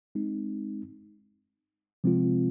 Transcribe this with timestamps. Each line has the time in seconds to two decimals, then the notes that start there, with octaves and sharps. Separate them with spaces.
0.15 G#3 C4 D#4
2.04 C3 F3 G#3 C4 F4